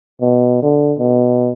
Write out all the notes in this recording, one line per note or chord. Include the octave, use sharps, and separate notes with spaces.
B2
D3
B2